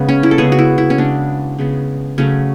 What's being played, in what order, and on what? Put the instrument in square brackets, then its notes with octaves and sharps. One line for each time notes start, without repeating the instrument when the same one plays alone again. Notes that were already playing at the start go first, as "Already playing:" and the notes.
Already playing: [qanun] C#3 G#3 B3
C#4
E4
A4
C#3 G#3 B3 G#4
F#4
E4
E4
C#4
C#3 G#3 B3 D4
C#3 G#3 B3
C#3 F#3 A3 C#4